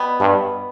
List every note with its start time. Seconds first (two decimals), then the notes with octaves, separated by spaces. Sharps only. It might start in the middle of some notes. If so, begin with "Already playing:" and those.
Already playing: B2 G3 B3
0.20 G2